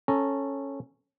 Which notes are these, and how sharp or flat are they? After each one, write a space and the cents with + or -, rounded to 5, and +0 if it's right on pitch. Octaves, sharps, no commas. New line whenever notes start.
C#4 -10 A4 +0 A#5 +0